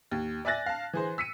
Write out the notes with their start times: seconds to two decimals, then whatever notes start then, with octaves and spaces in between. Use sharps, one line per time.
0.11 D#2
0.45 D5 E5 G#5 F#6 A6 A#6
0.66 F5 A5
0.93 E3 G#4 C5
1.18 E6 B6 C#7 D#7